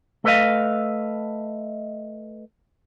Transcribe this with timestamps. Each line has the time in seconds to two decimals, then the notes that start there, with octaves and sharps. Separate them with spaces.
0.24 A3 A4 B4 C#5 D#5 F5